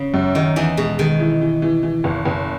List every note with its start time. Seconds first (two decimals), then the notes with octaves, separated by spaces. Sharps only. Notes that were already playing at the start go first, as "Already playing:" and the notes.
Already playing: C#3
0.14 F#2
0.35 D#3 D#4
0.56 E2 E3 D#4
0.77 B2 G#3
0.99 D#3 G#3
1.20 E3
1.41 E3
1.62 E3
1.83 E3
2.04 F#1
2.25 F#1